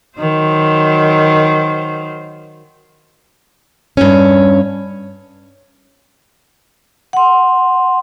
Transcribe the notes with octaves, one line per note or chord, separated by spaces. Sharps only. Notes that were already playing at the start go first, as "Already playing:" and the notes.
D#3 F#3 C5
G2 C#4
F#5 C6